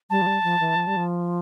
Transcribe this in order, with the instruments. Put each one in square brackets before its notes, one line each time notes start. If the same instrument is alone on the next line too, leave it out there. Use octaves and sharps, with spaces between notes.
[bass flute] G3 [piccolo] A5
[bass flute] F3
G3
F3
E3
F3
G3
F3